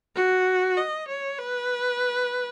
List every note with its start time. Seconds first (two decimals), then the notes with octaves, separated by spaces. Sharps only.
0.16 F#4
0.77 D#5
1.08 C#5
1.39 B4